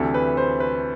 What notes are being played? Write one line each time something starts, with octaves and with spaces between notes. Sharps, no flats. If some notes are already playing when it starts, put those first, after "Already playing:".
Already playing: D2 C3 E3 A4
B4
C5
B4